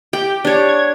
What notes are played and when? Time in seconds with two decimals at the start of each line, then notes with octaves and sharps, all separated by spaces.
0.13 G4 G5
0.45 D4 C#5
0.68 G#6